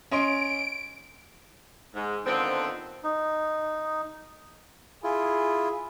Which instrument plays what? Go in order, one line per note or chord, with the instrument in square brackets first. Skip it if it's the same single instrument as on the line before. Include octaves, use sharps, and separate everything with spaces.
[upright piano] C#4 D#5 C6 [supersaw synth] D7
[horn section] G#2
D3 D#3 F3 B3 C4
[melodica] D#4
[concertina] E4 F4 [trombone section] G#4